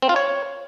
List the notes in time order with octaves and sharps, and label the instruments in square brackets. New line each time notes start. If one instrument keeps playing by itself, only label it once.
[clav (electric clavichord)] C4
F4
C#5